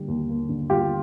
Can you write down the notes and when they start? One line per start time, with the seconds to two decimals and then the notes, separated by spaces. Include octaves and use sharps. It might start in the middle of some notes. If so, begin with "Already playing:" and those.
Already playing: D3 G3 A#3
0.08 D#2
0.30 A#3
0.49 D3
0.70 G3 F4 G4